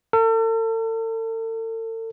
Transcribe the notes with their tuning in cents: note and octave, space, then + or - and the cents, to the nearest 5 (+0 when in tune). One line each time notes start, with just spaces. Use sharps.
A4 +40